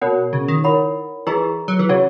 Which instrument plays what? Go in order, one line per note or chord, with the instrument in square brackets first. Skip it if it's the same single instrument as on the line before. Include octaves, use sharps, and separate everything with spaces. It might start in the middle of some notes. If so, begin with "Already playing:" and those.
[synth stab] B2 [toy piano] A#4 C#5 F#5
[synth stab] C#3
D#3
[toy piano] E4 A#4 C#5 F#5 B5
[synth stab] E3 [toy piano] D#4 G#4 D#5 A#5 C#6
[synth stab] F#3
E3
[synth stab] C#3 [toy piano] F#4 C#5 F#5